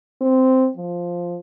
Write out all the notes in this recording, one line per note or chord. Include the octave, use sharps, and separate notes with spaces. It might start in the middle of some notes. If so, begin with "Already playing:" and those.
C4
F3